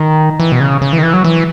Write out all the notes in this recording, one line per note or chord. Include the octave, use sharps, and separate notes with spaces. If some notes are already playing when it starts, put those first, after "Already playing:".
Already playing: D#3
E3
B2
C#3
C#3
E3
D#3
E3
F#3
E3